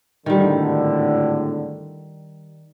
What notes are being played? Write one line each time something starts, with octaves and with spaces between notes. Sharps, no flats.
G#1 A2 D3 D#3 G3